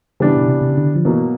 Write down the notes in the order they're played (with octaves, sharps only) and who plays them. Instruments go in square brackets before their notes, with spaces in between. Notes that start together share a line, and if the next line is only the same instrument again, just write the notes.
[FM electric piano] C#3 [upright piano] E3 G3 B3 D4
[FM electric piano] B2
C3
C3
C#3
D3
F3
[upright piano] B2 F#3 A#3 [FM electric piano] E3